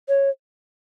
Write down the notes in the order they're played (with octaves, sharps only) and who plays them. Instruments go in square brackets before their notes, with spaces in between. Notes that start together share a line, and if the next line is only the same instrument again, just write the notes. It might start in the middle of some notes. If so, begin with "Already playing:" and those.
[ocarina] C#5